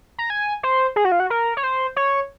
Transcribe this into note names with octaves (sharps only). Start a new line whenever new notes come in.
A#5
G#5
C5
G#4
F#4
F4
F#4
A#4
C#5
C5
C#5